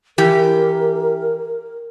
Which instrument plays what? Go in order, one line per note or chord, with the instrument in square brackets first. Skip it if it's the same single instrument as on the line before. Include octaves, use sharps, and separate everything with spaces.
[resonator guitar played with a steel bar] E3 G4 [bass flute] A#4